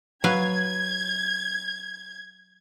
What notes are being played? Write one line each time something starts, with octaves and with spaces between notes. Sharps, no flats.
F#3 B4 F5 G#6